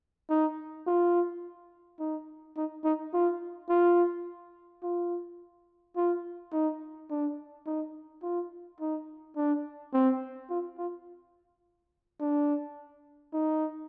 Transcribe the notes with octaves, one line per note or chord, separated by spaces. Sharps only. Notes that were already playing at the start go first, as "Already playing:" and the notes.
D#4
F4
D#4
D#4
D#4
F4
F4
F4
F4
D#4
D4
D#4
F4
D#4
D4
C4
F4
F4
D4
D#4